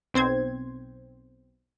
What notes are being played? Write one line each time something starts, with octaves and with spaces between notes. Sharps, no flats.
B1 C4 C5 G#6